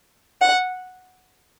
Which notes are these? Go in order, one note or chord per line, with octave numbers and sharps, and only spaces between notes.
F#5